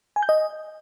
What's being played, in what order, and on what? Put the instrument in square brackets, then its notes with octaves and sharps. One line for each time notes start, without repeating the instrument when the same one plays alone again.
[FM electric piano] G#5
G6
D#5